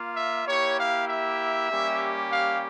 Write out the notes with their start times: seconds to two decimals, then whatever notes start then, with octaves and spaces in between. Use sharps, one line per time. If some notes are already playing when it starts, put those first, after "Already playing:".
Already playing: A#3 F4
0.16 E5
0.47 A#3 E4 G4 C#5
0.78 F5
1.08 E5
1.71 G3 A#3 C#4 G4
2.32 F5